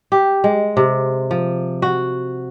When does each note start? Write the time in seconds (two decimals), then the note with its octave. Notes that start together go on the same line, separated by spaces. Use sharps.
0.12 G4
0.44 G#3
0.77 C3
1.31 F3
1.82 F#4